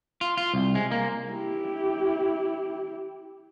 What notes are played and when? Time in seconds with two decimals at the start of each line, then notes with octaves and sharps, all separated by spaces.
0.21 F4
0.37 F4
0.54 C2
0.75 G#3
0.92 A#3
1.31 E4 G4